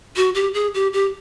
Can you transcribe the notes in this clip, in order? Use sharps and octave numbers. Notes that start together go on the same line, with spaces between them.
F#4
G4
G#4
G4
G4